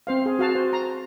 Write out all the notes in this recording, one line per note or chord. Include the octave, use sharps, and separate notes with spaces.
C4 C5 F5
G#4
F#4 F5 A5
C5
A#5